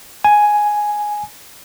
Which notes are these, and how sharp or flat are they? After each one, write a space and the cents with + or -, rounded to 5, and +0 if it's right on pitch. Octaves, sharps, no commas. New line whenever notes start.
G#5 +5